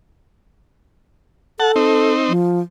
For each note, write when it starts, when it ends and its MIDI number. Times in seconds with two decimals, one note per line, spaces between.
1.60 2.12 69
1.60 1.72 78
1.60 1.72 81
1.76 2.33 60
1.76 2.33 63
2.29 2.60 53